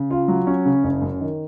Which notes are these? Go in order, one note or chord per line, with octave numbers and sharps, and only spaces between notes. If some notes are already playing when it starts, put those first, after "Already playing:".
Already playing: C#3
F4
F#3
C#4
C#3
F#1
F#2
D#3